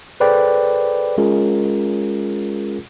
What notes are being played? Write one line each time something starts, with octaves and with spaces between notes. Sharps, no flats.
G#4 A4 B4 C5 D5 G5
G#3 C#4 F4 G#4 A#4